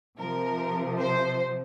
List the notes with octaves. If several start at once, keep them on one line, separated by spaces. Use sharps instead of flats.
C3 F3 A#4
C5